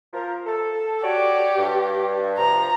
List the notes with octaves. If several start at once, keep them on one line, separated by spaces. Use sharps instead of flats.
F3 A#4
A4
F#4 G4 C#5 D5
G2
C3 F3 A#5